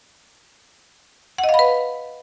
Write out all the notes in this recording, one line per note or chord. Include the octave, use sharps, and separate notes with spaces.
F#5
D#5
F5
B5
B4